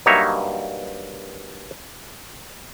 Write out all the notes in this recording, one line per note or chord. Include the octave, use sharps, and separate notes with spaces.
G2 F#3 A#3 D#4 C#5 E5